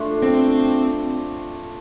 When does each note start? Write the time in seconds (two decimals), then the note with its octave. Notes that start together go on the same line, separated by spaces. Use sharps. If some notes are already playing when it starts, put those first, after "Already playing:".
Already playing: A3 D4 F4
0.23 C4